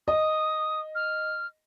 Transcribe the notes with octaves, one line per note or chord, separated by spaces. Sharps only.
D#5 D#6
F6